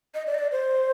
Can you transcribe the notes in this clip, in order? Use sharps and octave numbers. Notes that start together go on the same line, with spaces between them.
D#5
D5
D#5
D5
C5